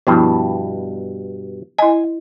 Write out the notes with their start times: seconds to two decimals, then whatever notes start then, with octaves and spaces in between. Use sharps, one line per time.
0.07 G2 B2 F3 B3 E4
1.78 E4 D#5 G#5